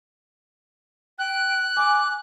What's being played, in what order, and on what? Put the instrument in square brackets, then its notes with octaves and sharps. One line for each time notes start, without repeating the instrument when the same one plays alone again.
[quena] G5 [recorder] F#6
[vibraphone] G#5 [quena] D6